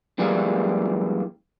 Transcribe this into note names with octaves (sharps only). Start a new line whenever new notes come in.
F#2 E3 G3 G#3 A#3